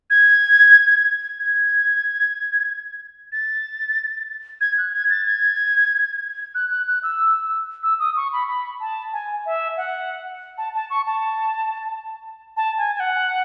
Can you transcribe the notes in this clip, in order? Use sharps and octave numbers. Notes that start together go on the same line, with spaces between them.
G#6
G#6
A6
G#6
F#6
G#6
A6
G#6
F#6
F#6
F#6
E6
E6
D#6
C#6
B5
B5
A5
G#5
E5
F#5
A5
A5
C#6
A5
A5
G#5
G#5
F#5